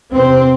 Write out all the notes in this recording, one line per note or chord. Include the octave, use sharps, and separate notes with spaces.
E2 C3 C4